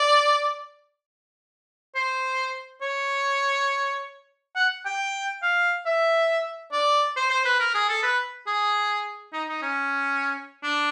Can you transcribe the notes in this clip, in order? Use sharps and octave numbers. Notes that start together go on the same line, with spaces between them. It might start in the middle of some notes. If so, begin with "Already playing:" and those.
Already playing: D5
C5
C#5
F#5
G5
F5
E5
D5
C5
C5
B4
A#4
G#4
A4
B4
G#4
D#4
D#4
C#4
D4